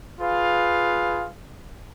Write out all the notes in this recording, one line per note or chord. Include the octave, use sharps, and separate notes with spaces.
F4 G#4 B4 F5